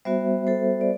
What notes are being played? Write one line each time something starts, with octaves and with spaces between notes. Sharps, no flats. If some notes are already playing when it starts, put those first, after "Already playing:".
G3 B3 F#4 C5 E5
A4 C5
D5